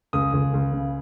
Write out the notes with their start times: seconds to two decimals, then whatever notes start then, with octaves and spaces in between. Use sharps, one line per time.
0.13 C#2 D#6
0.33 C#2
0.54 C#2
0.72 C#3